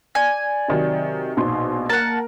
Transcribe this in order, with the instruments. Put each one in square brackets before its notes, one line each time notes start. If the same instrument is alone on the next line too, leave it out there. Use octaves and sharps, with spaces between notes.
[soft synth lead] D5 [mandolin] G#5
[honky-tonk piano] C3 D#3 F#3
[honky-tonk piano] A#1 B2 C6 [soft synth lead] D#4
[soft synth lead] A#3 [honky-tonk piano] A#4 [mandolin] F#5 A5